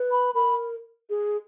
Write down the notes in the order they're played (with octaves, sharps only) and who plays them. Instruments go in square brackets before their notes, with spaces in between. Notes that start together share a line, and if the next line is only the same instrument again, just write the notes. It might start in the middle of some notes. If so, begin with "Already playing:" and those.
Already playing: [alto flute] B4
[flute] B5
[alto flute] A#4 [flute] B5
[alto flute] G#4